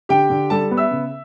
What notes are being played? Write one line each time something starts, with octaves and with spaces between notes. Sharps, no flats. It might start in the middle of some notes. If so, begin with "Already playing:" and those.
D3 G4 G5
D3
G3 A4 A5
B3
E5 E6
C#3